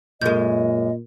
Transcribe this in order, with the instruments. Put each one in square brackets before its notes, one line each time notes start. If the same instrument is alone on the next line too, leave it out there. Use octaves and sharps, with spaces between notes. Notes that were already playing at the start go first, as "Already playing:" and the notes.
[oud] F#2 G#3 [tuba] A#2 [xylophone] A#4 G6 [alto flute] D#5